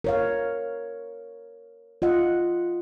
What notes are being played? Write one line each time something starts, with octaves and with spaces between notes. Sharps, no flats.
A#4 C#5 F5
F4 D#5 F#5